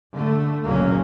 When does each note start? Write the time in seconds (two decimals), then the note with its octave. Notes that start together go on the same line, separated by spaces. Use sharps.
0.14 D3 A3
0.66 F#1 C#2 A#2 F#3 A#3 C#4